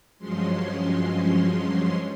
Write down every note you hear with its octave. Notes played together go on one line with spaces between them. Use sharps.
G2 F3 F#3 G#3 C#4 C6